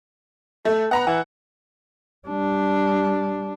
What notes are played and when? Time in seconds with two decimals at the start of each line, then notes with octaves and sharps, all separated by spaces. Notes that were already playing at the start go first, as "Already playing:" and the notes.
0.65 A3 A4
0.91 B3 F#5 A#5 B5
1.07 E3 F#5
2.28 G3 D4